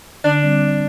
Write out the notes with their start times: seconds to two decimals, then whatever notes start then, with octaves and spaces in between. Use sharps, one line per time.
0.24 D3 D4
0.43 G3 C4
0.61 D3